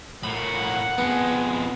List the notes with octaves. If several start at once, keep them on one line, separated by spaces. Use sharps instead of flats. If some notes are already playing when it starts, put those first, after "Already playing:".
A2 A#3 F#5 B5
F2 G#3 B3